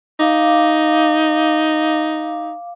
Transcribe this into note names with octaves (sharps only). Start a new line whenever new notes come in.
D#4 F5 D6